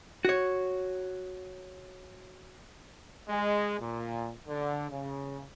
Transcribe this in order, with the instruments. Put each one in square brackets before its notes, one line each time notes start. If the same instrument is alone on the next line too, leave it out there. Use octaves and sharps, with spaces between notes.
[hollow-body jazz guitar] F#4 C#5
[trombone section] G#3
A#2
D3
C#3